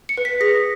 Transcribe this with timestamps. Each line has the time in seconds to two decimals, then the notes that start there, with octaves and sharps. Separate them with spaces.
0.09 C#7
0.17 B4
0.25 B6
0.41 G#4 A#6